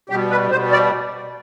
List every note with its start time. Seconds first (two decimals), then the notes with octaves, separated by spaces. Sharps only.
0.09 B2 G3 G4
0.30 B4
0.51 B2 G3 C5
0.72 D5